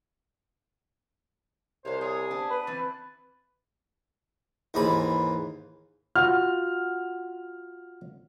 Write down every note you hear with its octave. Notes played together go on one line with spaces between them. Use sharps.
C2 C5 C#5 F5
G#4 C#5
B3 D4
B4
E3 C4 A5
D#2 G#2 E3 B5
F4 F#4 F#5 F6